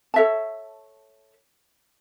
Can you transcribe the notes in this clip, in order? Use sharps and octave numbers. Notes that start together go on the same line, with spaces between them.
A4 C#5 E5 A5